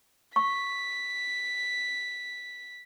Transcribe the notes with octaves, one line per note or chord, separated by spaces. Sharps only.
C#6 B6